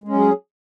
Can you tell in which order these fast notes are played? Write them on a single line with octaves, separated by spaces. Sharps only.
G#3 C#4 F#3 G#4